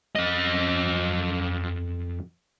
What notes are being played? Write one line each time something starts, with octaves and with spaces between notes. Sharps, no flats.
F2 D#5